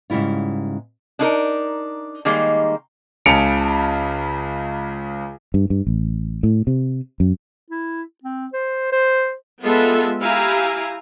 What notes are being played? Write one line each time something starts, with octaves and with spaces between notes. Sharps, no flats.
G#2 C#3 G3 E4 F4
D4 D#4 A#4
D#3 G3 G#3 A#3 D#4
C#2 C#3 A5 C#7 D7 F7
G2
G2
A1
A2
C3
F#2
E4
C4
C5
C5
G#3 B3 F4 A4 B4 E5
E4 G4 F5 G#5 A#5